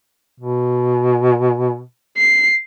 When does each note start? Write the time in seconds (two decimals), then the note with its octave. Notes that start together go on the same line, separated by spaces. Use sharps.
0.40 B2
2.17 C7